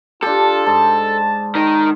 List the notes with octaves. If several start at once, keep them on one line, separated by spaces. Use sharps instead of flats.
D4 F4 G4 A4
G#2 A5
D#3 D#4